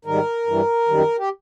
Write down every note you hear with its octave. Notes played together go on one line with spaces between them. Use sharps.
G#2 D#3 G3 A#4
G2 E3 G3
F#2 D#3 G3
G4